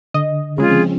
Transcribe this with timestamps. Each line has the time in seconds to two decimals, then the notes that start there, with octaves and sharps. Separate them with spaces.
0.14 D3 D#5
0.58 C#3 F3 G#3 C4 C#4 F4 G#4